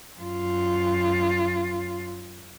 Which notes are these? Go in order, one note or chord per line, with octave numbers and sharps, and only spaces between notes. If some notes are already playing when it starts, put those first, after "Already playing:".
F#2 F4